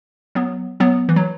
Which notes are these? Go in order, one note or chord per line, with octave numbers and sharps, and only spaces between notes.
F#3 B3
F#3 B3
E3
F#3